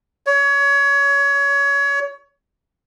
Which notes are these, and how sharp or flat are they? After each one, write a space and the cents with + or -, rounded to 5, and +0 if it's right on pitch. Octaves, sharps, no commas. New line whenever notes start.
C#5 +25